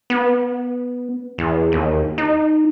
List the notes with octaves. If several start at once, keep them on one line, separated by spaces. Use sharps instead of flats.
B3
E2
D#2
D#4